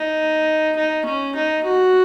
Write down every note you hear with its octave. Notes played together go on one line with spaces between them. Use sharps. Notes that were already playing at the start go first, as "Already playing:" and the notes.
Already playing: D#4
D#4
C#4
D#4
F#4